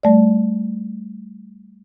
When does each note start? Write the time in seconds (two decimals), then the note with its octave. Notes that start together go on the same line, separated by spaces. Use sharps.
0.03 G3 A3 D5